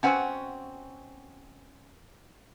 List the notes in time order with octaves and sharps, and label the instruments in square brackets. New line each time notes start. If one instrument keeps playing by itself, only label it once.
[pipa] B2 C4 F#4 [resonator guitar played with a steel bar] C#4 F#5 G#5